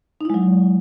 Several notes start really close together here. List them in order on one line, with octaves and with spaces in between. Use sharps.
D#4 E4 G#3 F#3